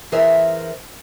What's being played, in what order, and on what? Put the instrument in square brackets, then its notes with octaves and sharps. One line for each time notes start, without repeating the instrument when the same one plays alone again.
[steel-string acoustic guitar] E3 G#4 A#4 C5 E5